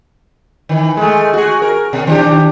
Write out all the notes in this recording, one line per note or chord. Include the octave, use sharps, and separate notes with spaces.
D#3 E3
G#3 A3
F#4 G#4
A#4
B2
D#3 D4 G4